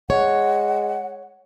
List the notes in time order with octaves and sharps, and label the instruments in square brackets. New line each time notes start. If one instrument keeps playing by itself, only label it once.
[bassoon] G#3 [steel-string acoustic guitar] C#5 [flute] F#5